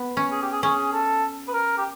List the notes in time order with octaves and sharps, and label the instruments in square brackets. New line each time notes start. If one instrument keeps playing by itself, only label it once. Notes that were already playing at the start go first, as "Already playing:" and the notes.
Already playing: [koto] B3
C#4
[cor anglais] G#4
G4
G#4
[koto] C#4 [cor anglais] G#4
[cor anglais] A4
B4
A#4
G4